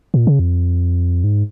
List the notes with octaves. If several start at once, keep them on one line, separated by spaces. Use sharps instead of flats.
A#2
C#3
F2
G#2